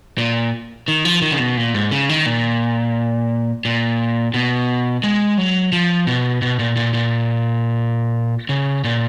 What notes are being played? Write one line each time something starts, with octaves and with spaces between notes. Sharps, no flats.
A#2
D#3
F3
D#3
C#3
B2
A#2
G#2
C#3
D#3
A#2
A#2
B2
G#3
F#3
F3
B2
B2
A#2
A#2
A#2
C#3
A#2